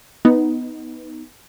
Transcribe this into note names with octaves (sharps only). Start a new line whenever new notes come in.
B3 D#4